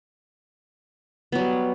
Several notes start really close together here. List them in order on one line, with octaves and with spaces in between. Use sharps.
B3 F#3 G3